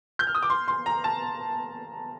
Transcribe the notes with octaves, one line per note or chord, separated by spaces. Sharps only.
G6
F6
D#6
D6
C6
C6
A#5
A5